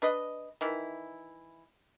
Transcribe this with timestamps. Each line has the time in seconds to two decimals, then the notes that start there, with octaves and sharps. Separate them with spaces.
0.02 D4 B4 D#5
0.61 D#3 E3 E4